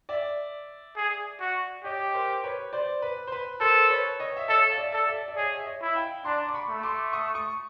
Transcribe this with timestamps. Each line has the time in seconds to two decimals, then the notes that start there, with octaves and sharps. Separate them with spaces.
0.09 D5 E5
0.96 G#4
1.40 F#4
1.84 G4 C#5 D#5
2.14 A#4 C5
2.44 B4 C#5
2.73 C5 D5
3.02 B4
3.27 C5
3.32 B4
3.60 A4 A#4 C5
3.90 B4 C#5
4.20 C#5 D#5
4.37 E5
4.49 A4 C#5 D#5
4.71 F5
4.78 D5 E5
4.93 A4
5.07 D5 E5
5.28 D5
5.36 G#4 C#5 D#5
5.56 E5
5.66 C#5 D#5
5.81 E4
5.95 F5 G5
6.25 D4 A#5 C6
6.49 D6
6.54 B5 C#6
6.69 A3
6.83 C6 D6
7.13 C#6 D#6
7.35 C#6 D#6